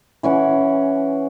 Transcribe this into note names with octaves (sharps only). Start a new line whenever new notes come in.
E3 C#4 F#5